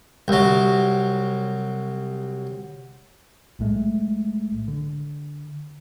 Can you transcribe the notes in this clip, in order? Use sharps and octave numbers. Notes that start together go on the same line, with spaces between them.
C2 F#3
B1 A2 G#3 A3
D3